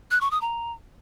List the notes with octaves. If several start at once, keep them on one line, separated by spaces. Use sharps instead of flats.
F#6
C#6
D#6
A#5